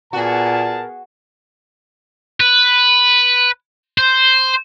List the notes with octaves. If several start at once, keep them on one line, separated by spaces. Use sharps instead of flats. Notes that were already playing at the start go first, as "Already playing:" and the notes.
A#2 B3 F#4 G#4 A#4 A5
B4
C5